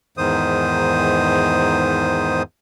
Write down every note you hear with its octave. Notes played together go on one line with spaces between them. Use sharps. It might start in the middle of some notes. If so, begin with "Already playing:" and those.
E2 G#2 D#3 C5 D#6